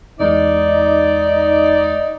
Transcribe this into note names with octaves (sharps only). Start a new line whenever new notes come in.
E2 G#3 D#4 D5